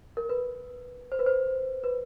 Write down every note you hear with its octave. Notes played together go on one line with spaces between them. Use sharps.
A#4
B4
C5
B4
C5
B4